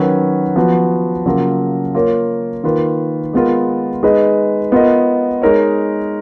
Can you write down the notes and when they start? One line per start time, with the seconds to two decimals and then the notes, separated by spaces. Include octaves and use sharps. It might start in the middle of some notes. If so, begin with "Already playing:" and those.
Already playing: D#3 F#3 C#4 F#4 B4
0.56 F3 B3 F#4 B4
1.26 C#3 F#3 A#3 F4 A#4
1.94 A#3 F4 A#4 C#5
2.64 D#3 A#3 F4 B4
3.33 G#3 B3 F4 A#4
4.03 G#3 D#4 G#4 B4 D#5
4.72 B3 F4 A#4 D#5
5.42 G#3 D#4 A#4 C#5